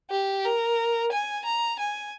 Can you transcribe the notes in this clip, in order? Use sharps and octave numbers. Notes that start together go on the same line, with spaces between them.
G4
A#4
G#5
A#5
G#5